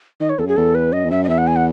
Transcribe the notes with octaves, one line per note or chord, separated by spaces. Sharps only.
D#3 D#5
C#5
E2 A4
F#2 G#4
E2 A4
B4
F#2 D#5
E2
F#2 E5
D#5
E2 E5
F#5
G#5
F#5